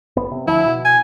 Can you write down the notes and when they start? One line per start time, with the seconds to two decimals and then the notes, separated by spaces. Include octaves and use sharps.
0.16 F#1 B3
0.31 C3
0.47 D2 F3 E4
0.66 B2
0.85 G#5